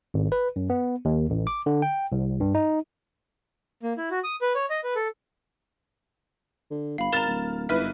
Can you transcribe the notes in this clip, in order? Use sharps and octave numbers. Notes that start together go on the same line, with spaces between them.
G#1
B4
F#2
B3
D#2
A1
D6
D3
G5
C2
G2
D#4
A#3
E4
F#4
D#6
B4
C#5
D#5
B4
A4
D3
G1 F5 B5
G#1 A#4 A#5 F6 A6 E7
D1
G1 G#2 E4 B4 E5 F6